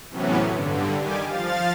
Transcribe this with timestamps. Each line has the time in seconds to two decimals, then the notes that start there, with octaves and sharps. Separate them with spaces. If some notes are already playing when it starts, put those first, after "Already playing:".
0.10 A2 C3 E3 F#3 B3 C#4
0.52 G2 D3
0.99 D#3 G3 G4 G#5 D6
1.27 F3 F5 A6